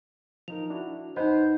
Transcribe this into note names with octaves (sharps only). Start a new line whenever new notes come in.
F3 D#4 A#4 F7
D4 E4 F#4
F2 D#4 B4 C5 D#5 F#5